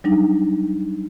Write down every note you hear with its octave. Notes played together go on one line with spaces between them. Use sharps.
F#3 G3 D4 D#4